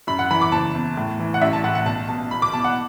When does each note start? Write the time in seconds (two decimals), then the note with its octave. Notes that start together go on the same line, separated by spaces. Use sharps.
0.07 F#2 B5
0.19 F#5
0.30 E3 B5
0.41 D6
0.52 F#1 A5
0.75 E2
0.97 A2
1.19 E3
1.34 F#5
1.41 A1 E5
1.53 A5
1.64 A2 F#5
1.75 F#5
1.86 B1 A5
2.08 B2 A5
2.31 E2 B5
2.42 D6
2.53 B2 A5
2.64 F#5